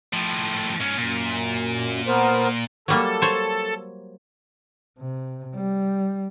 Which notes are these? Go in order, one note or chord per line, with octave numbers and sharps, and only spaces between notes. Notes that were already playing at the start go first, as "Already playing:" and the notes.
A2 F3
G#2 C#4
F#2 A#2
B3 A#4 C5
F#3 G3 A#3 A4
C5 C#5
C3
G3